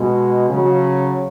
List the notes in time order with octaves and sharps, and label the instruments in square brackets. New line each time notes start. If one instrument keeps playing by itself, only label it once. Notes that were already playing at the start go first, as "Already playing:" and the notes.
Already playing: [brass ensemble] B2 G#3
C#3 F#3